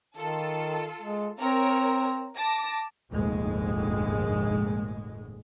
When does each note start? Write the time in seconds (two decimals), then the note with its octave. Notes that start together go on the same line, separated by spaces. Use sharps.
0.17 D#3 F4 A4
1.02 G#3
1.39 C4 A#4 C#5 A#5
2.36 A5 D6 A#6
3.11 F1 A#1 D#2 G#2 G#3